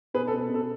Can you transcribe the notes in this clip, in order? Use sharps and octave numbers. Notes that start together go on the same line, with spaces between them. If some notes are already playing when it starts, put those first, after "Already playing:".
B2 G#4 B4
A4
B2
B2 A4